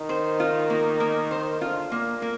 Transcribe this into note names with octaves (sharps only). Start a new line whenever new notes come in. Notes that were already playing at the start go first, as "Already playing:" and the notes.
Already playing: D#3
C5
F4
A#3
A#3
C5
D3 F4
A#2 A#3
A#3